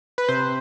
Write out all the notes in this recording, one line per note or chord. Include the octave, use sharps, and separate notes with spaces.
B4
C3 C5